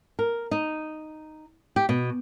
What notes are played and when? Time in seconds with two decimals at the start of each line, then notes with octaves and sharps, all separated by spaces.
0.19 A#4
0.51 D#4
1.76 G4
1.89 B2